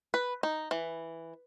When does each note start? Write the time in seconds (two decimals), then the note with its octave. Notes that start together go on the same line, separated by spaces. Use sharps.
0.14 B4
0.43 D#4
0.71 E3